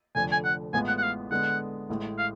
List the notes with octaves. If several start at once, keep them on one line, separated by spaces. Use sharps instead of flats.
F1 F2 D3 G#5
G#5
F#5
A1 A2 G#3 B3 F4 G#5
F#5
F#5
F5
D3 G#3 B3 F#5
A1 A2 G#3
F5